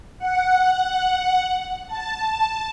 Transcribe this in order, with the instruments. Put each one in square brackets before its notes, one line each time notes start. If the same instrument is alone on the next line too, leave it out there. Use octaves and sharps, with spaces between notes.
[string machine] F#5
A5